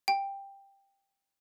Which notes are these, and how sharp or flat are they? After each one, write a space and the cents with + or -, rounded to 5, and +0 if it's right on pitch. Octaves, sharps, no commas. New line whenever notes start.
G5 +10